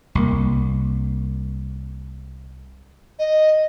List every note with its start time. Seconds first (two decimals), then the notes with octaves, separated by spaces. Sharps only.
0.15 C2 A#3
3.19 D#5